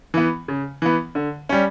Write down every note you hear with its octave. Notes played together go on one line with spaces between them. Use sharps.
E3 B3
C#3
E3 B3
D3
G3 C#4